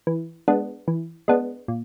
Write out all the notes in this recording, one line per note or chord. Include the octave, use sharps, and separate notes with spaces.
E3
G#3 B3 D4
E3
G#3 B3 D4
A#2